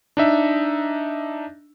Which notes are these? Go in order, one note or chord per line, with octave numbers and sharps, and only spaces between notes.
D4 D#4 E5